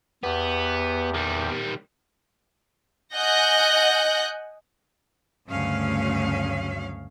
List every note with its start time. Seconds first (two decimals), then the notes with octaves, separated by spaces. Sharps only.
0.23 E2 B3 G4
1.14 D#3 G3
3.15 D#5 F#5 G#5 F#6 G6 A#6
5.49 D2 G2 C#3 F#3 C#4 F5